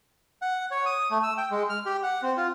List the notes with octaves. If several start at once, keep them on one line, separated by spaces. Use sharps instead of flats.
F#5
C#5
D#6
A3
E6
G5
G#3
F6
G4
F#5
C4
F4